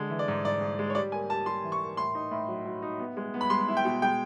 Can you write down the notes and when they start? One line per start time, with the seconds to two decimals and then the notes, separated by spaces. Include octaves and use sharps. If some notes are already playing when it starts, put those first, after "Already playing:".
Already playing: D3 G#3
0.10 E3
0.19 D5
0.28 G#2
0.44 G#2 D5
0.61 G#2
0.79 G#3
0.90 C#5
0.95 G3 D5
1.12 A#3 G#5
1.30 G3 A5
1.46 G3 C6
1.64 E3
1.72 C#6
1.81 A#3
1.97 A2 C6
2.15 D#4
2.31 A2
2.48 F#3
2.66 F#3
2.82 D#4
2.99 B3
3.17 G#3
3.34 B3
3.41 B5
3.50 G#3 C6
3.68 E4
3.77 G5
3.85 B2
4.02 G#3 G5